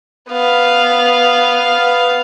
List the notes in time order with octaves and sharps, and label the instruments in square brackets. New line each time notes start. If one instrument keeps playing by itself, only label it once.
[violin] B3 F5